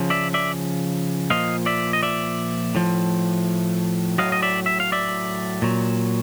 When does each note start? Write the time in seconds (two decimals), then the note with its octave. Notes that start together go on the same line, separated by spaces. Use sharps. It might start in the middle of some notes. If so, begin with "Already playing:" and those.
Already playing: C#3 F3
0.10 D5 E5
0.34 D5 E5
1.30 A#2 F3 D#5 F5
1.66 D5 E5
1.93 D#5
2.03 D5 E5
2.75 A2 F3
4.18 A2 F#3 D#5 F5
4.32 D#5
4.42 D5 E5
4.66 E5
4.80 F5
4.92 D5 E5
5.62 A#2 F#3